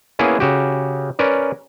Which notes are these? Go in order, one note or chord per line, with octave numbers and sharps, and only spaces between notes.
A#3 B3 C#4 E4 G#4 B4
C#3 F#4 G4
C#4 A#4 B4 D5